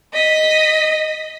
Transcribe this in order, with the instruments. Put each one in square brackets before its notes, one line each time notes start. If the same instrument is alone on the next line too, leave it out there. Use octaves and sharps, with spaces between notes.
[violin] D#5 B6